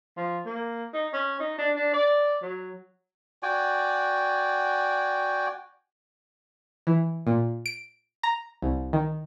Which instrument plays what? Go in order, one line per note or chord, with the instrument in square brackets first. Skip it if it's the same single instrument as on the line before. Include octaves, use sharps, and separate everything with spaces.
[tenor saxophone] F3
A#3
D#4
C#4
D#4
D4
D4
D5
F#3
[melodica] F#4 D5 G5 G#5
[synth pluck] E3
A#2
D7
A#5
C2
D#3